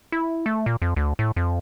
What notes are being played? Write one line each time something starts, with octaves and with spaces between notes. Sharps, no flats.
E4
A3
A#2
F2
D2
A2
F2